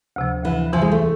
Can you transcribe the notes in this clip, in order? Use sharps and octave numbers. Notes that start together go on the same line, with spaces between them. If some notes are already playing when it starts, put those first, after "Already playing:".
D2 C3 F3
D2 C3 E3 F3
E2 C3 E3 F3
G#3
A3